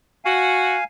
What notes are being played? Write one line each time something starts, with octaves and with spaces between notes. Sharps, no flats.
F#4 F5 G#5